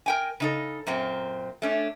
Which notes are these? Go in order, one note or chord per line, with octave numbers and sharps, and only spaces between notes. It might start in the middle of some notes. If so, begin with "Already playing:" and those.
A#4 G5 G#5
C#3 D#4 A4
F#2 A#2 C4
A3 C#4 D4